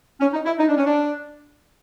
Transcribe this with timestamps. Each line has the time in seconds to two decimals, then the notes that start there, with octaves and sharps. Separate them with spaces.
0.21 C#4
0.34 D#4
0.45 E4
0.58 D#4
0.68 D4
0.77 C#4
0.87 D4